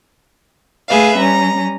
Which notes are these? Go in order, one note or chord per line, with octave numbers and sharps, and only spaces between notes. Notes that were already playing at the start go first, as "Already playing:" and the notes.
A3 G#4 B4 E5 F5
G3 C#4 A#5